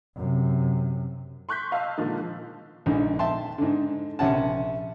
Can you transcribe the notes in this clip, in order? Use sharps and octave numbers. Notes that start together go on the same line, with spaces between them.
F#2 C3
C6 C#6 F#6 G6 B6
D#5 F5 A5 E6
A#2 D3 D#3 F3 G#3
A#1 G#2 D3 D#3
E5 G5 A5 C6
G#2 D3
A#1 C3 C#4 F#5 A5